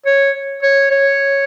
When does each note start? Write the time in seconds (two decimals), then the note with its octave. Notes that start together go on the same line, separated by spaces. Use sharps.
0.06 C#5
0.63 C#5
0.91 C#5